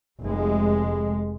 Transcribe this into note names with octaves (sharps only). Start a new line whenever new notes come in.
F1 G#3